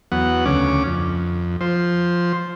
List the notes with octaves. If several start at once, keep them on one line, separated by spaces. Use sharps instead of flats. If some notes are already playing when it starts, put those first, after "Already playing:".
E2 F#3 B3 F#5
D2 C#3 C#4 D6
F2
F3 C5